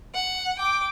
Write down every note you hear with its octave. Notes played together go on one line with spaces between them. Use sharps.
F#5
G5 D6